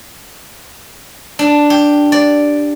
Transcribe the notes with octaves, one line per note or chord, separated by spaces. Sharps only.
D4
G4
D5